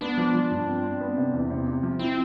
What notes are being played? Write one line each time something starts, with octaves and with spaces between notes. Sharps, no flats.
B3 D4
F3
F3
G2
C4
C4
B3
C3
E2
C3
C3
F3
C4 E4